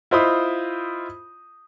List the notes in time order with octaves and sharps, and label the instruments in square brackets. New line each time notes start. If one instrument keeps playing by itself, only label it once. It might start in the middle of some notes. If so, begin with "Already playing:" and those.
[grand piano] E4 F4 C5 D#5 B5 D#6